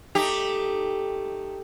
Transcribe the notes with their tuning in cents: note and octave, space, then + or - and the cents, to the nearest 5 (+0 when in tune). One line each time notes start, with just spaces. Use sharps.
A3 +0 D#4 -10 G4 +0